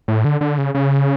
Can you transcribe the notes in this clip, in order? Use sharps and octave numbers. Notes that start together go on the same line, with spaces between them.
A2
D3
D3
C#3
C#3